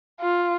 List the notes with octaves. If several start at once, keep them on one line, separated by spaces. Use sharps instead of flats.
F4